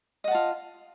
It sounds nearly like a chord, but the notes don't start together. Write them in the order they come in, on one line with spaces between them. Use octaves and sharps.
D#5 F#5 A5 F4